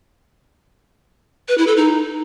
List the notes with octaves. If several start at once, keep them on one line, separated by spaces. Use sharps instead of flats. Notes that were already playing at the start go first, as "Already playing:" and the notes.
B4
E4
A4
D#4